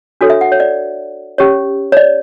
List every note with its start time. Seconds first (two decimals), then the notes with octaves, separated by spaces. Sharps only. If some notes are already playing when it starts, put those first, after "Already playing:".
0.21 D4 F#4 A4 C#5
0.30 E5
0.41 F#5
0.52 C#5
0.60 D5
1.38 C#4 G4 C#5
1.92 C#5
1.97 D5